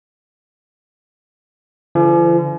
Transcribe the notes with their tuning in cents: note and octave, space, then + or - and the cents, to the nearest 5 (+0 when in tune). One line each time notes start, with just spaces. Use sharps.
D3 -15 F3 -45